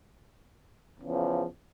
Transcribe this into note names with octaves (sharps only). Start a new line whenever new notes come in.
E2 C#3 F3